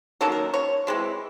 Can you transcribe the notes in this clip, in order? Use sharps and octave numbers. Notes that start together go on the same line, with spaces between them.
D#3 F#3 A#3 C#4 A4
A#4
C#5
E3 G#3 C4